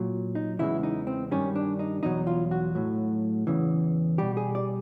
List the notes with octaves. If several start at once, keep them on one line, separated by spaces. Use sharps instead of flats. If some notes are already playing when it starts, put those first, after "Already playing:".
Already playing: A#2 F#3
D#4
E2 C#3 E3 G#3 E4
D#4
C4
G2 D#3 G3 C#4
D4
D#4
E2 B2 F#3 D#4
F4
F#4
A2 F#3
E2 C#3 E3
B2 G3 G4
G#4
D5